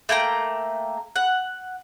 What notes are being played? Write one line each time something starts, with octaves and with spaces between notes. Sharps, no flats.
A3 A#3 G5 A#5
F#5